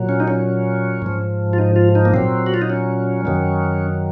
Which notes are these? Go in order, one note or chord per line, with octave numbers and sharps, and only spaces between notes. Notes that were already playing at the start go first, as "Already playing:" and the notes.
Already playing: A#2 F#3
C#4
D#4
C#4
G#2 F3
F4
D#4
F4
D#4
A#3
A#2 F#3 C4
F#4
F4
D#4
C#4
F#2 D#3 F#3